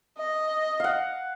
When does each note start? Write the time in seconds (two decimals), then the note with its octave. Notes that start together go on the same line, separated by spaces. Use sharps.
0.18 D#5
0.80 F5 F#5